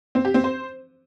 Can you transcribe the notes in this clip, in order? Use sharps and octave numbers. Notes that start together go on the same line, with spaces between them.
C4
G4
C4
C5